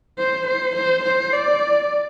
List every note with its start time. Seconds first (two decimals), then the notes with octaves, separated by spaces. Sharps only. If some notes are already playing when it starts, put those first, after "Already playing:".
0.18 C5
0.47 C5
0.76 C5
1.04 C5
1.33 D5